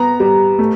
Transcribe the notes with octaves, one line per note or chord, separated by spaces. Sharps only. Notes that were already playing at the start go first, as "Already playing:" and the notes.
Already playing: B3 A#5
G3
A3